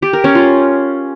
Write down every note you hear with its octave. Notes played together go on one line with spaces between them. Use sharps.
G4
A#4
C#4
F4